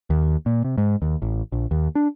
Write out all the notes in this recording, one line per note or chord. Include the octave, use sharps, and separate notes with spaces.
D#2
A#2
C3
G#2
D#2
A1
A#1
D#2
D4